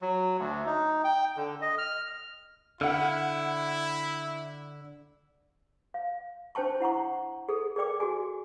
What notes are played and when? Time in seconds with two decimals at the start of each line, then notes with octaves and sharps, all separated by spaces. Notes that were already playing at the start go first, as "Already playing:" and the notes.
0.02 F#3
0.39 D2
0.66 D#4
1.04 G5
1.37 D3
1.62 D#5
1.78 F6
2.81 D3 E4 F#5 F6
5.94 F5
6.55 D4 C5 G5 A5 C#6
6.80 E4 F#5 A#5 C#6
7.49 G#4 A4
7.76 G#4 A#4 D5 G5 D6
8.00 F#4 G#4 G#5